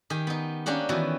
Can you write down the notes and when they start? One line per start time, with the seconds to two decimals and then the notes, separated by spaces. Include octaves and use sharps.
0.10 D#3 G4 G#5
0.27 B3 D#4
0.66 A#3 C#4 D4 G4 F#5
0.89 D#3 E3 B3 F#4